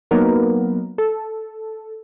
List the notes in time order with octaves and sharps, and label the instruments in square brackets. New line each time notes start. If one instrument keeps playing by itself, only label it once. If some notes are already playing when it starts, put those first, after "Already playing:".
[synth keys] F#3 A#3 B3 D#4 A#4 B4
A4